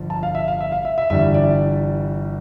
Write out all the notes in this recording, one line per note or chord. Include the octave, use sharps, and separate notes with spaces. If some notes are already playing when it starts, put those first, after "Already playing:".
Already playing: G1 G2 F3
A5
F5
E5
F5
E5
F5
E5
E5
G1 G2 E3 G3 E5
D5